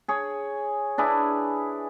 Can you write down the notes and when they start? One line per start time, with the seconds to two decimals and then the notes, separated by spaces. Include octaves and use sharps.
0.08 G#4 C#5
0.98 D4 E4 G#4 B4